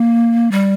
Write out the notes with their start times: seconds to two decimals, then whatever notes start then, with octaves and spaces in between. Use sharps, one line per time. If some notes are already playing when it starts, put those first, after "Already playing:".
Already playing: A#3
0.52 G3